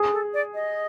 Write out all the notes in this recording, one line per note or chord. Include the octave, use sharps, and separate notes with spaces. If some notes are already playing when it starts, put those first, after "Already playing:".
Already playing: G#4
A4
D5
D#5